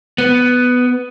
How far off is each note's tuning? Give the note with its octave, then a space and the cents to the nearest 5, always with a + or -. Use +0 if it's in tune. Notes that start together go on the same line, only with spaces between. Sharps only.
B3 +5